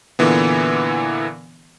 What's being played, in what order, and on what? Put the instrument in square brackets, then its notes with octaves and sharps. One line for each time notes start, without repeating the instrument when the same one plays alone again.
[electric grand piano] A#2 D3 E3 B3